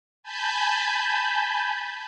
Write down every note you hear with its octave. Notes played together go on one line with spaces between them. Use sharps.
G#5 A5 B5 G6